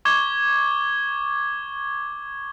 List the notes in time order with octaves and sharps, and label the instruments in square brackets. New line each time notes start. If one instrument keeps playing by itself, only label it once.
[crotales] C#6 D6 G#6 G7